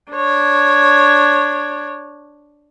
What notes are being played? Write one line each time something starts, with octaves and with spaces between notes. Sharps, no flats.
D4 C#5